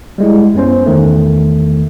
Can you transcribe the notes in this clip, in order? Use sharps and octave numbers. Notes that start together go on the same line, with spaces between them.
G3 G#3 E4
F#2 B3 C#4 C5
E2 D#3 A3